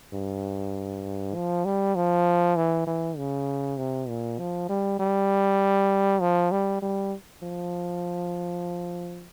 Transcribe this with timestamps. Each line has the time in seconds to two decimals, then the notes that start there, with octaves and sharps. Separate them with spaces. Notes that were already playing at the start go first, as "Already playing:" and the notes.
0.14 G2
1.35 F3
1.65 G3
1.96 F3
2.57 E3
2.87 E3
3.18 C#3
3.78 C3
4.08 A#2
4.39 F3
4.69 G3
4.99 G3
6.21 F3
6.52 G3
6.82 G3
7.43 F3